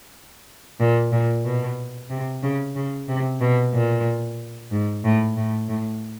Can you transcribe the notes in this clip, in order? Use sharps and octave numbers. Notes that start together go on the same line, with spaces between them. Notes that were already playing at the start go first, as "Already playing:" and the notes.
A#2
A#2
B2
C3
C#3
C#3
C3
B2
A#2
G#2
A2
A2
A2